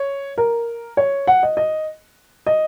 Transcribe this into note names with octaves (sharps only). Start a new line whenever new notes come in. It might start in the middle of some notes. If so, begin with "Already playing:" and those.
Already playing: C#5
A#4
C#5
F#5
D#5
D#5
D#5